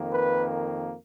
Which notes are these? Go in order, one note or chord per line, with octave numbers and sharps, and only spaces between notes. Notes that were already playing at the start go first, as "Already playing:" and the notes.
Already playing: F2 D#3 A#3
B4